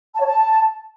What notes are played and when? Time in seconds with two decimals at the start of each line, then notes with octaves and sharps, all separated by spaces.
0.15 A5
0.20 C#5
0.26 A5